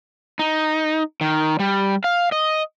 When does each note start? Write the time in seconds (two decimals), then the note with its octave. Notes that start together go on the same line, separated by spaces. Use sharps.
0.39 D#4
1.21 D#3
1.59 G3
2.04 F5
2.32 D#5